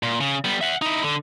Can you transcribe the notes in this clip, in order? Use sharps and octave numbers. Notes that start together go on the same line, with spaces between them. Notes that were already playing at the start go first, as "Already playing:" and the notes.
A#2
C#3
G3 B3
E5 F#5
D#4 E4
D3